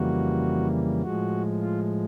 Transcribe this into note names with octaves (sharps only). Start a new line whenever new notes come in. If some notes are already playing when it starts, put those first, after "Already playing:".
Already playing: F2 C#3 E3 G3 A#3 F#4
A2 F3 G#3 F#4
F4